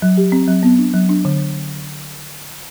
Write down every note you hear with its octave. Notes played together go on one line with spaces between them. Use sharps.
F#3
G4
C4
F#3
B3
D4
F#3
D4
D3